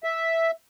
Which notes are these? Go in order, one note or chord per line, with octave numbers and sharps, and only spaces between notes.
E5